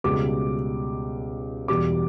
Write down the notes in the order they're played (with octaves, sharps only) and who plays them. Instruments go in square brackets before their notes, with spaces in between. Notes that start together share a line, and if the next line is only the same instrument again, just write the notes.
[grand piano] C#2 B2 G3 D6
E2 B2 G3 D6